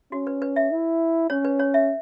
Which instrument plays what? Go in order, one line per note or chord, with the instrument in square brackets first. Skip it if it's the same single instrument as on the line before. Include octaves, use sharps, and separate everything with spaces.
[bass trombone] C#4 [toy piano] F#4
[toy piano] B4
B4
E5
[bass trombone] E4
[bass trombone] C#4 [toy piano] C#5
[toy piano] B4
C#5
E5